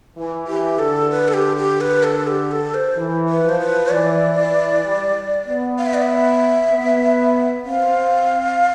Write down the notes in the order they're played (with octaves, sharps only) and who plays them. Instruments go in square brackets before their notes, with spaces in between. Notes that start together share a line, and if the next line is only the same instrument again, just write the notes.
[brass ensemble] E3
[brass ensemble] E3 [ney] G4
[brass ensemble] D3 [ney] A4
[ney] B4
A4
G4
G4
B4
A4
G4
A4
C5
[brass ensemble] E3
[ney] B4
[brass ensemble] F3 [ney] C5
[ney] B4
[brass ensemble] E3 [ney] D5
[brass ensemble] E3
G3
B3
[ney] F5
E5
D5
E5
[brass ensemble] B3
[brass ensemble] C4 [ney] F5